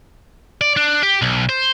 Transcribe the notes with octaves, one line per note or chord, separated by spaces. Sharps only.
D5
D4
G4
B1
C5